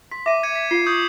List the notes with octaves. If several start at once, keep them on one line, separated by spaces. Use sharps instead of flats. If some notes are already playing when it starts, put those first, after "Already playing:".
C6 B6
E5 D6 D#7
G#6 C#7 D#7
B6
F4 F5 C7
C#6 D#6 G6